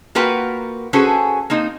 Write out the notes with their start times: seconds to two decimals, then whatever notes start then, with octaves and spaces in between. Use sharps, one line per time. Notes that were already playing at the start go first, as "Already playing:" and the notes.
0.15 A#3 F4 F#4 A#4 B4 G5
0.93 C#4 F#4 G#4 A4 B4 C5
1.50 A#3 C4 D#4